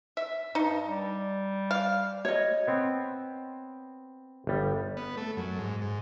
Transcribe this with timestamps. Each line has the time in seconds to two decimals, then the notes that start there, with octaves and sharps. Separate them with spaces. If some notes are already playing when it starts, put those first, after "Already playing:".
0.17 E5
0.55 G2 D#4
0.86 G3
1.71 F5
2.25 C#5 D#5
2.67 B3 C4
4.47 G1 G3
4.97 B3
5.17 A3
5.37 F#2
5.58 G#2
5.81 G#2